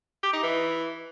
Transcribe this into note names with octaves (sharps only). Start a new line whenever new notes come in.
G4
D#4
E3